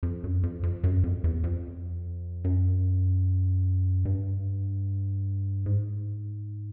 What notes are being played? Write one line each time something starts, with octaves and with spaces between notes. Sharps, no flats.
F2
F#2
F2
F2
F#2
F2
E2
F2
F#2
G2
G#2